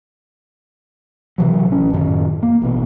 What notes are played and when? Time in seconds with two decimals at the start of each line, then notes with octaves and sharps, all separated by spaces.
1.38 C3 E3 F#3
1.68 A1 C#4
1.93 F#2 A2 D#3
2.43 A#3
2.62 A1 B2